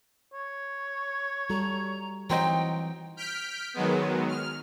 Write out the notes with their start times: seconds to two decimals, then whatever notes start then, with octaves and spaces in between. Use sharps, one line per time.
0.33 C#5
1.50 G3 F#4 A4 A#5
2.30 E3 F#3 C4 D#4 G5
3.17 F6 G6 B6 D7
3.74 D#3 F#3 G#3 B3
4.28 F6